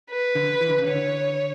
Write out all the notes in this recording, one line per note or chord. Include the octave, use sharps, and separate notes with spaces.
B4
D3
E3
D3
C#3
D3 C#5